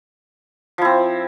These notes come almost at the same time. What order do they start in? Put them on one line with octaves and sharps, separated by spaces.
F3 E4 C4